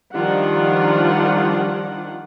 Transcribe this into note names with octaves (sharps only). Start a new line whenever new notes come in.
D#3 F3 G3 D4 F4 F#5